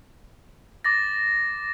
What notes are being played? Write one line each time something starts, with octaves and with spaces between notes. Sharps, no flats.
D6 A6 A#6